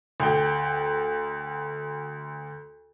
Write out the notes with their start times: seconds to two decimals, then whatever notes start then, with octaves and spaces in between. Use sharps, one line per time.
0.20 D2 G5